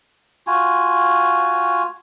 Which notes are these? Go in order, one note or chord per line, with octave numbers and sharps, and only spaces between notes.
F4 F#4 G#5